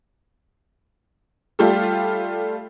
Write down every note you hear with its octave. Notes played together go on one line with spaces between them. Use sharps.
G3 A3 F4 G4 A4